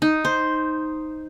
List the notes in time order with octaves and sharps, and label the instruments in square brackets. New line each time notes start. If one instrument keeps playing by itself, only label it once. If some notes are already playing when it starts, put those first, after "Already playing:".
[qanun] D#4
C5